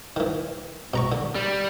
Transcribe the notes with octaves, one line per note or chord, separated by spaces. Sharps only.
D#3 E3
B2 A#5 C#6
D3
G3